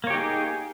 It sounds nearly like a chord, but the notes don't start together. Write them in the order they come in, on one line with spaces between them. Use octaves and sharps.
A#3 C#5 G4 D#4 G#4